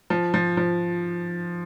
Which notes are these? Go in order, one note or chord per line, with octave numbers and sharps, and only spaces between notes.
F3
F3
F3